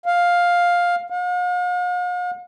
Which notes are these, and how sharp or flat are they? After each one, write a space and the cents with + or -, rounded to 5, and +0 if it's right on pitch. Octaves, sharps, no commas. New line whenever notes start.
F5 +10
F5 +45